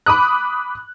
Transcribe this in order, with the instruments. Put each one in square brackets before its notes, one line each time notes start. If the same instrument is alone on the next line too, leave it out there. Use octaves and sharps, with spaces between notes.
[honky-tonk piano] B5 D6 D#6 F#6